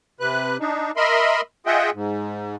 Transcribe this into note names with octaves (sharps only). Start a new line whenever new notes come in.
C3 B4 F#6
D4 D#4
A#4 D#5 E5 B5 C6
F4 G#4 D#5 E5 F#5 G5
G#2